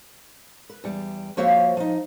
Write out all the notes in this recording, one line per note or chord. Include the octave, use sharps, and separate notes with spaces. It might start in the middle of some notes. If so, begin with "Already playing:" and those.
B4
E2 G3
F3 A#3 F#4 C5 C#5 E5
F3 D#4